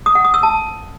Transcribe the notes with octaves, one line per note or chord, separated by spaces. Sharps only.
D#6
F#5
D#6
E6
A5